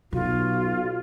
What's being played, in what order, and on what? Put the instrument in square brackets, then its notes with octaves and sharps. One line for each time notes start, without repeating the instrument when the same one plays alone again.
[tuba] B1 [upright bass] B2 [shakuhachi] F4 [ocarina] F#4